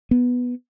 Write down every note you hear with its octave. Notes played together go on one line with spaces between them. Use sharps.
B3